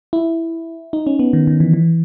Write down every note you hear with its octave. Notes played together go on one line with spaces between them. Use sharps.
E4
D#4
C#4
B3
D#3
D#3
E3
E3